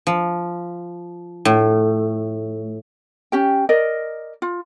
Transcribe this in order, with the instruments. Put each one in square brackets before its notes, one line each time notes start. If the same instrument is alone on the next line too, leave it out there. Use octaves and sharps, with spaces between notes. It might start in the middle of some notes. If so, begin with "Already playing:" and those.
[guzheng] F3
A2
[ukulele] C#4 G4 G5
A#4 D5 D#5
F4